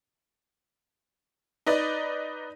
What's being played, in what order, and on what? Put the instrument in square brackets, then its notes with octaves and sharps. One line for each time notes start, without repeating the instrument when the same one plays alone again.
[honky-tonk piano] D#4 B4 D5 D#5